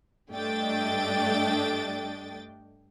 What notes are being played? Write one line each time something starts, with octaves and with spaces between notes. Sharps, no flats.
G2 A3 D4 D#5 G5 A6